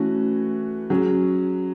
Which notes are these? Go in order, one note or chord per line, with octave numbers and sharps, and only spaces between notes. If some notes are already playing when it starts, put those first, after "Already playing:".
Already playing: E3 A3 C#4 F#4
F#3 C#4 G#4